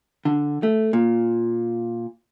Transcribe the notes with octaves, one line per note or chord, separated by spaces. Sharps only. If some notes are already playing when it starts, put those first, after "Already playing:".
D3
A3
A#2